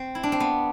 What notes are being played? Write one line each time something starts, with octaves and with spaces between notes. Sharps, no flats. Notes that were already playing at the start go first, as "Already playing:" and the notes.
Already playing: C4
E4
D4
C4
B3